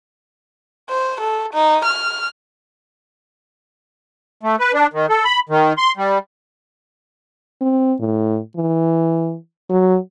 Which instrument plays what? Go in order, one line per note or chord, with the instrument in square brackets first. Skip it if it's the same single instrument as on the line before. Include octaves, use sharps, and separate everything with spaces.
[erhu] C5
A4
D#4
F6
[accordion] A3
B4
D4
D#3
A4
B5
D#3
C6
G3
[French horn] C4
A2
E3
F#3